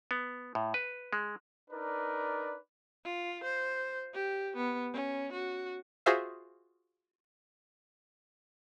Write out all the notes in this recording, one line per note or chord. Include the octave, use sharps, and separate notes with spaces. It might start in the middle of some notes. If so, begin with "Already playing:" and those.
B3
A2
B4
G#3
D4 D#4 A#4 B4 D5
F4
C5
G4
B3
C#4
F#4
F4 F#4 G#4 C5 E5 F5